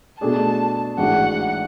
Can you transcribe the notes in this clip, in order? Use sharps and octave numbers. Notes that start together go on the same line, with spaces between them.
B2 A3 D4 G#4 A5
A1 G#2 G#3 D4 F#4 F#5